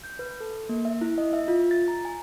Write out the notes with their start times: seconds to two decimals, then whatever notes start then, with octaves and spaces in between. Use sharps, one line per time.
0.04 G6
0.19 B4
0.40 A4
0.69 A#3
0.85 E5
1.01 E4
1.18 D#5
1.33 E5
1.48 F4
1.71 A6
1.88 A#5
2.05 G#5